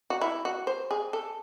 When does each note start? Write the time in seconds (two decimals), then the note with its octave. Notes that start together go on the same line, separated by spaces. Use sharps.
0.10 F#4
0.21 E4
0.45 F#4
0.67 C5
0.91 G#4
1.13 A4